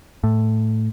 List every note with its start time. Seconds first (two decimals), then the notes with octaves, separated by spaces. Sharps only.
0.24 A2